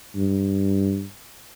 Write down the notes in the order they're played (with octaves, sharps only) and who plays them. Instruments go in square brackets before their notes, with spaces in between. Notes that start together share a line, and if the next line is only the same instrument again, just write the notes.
[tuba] G2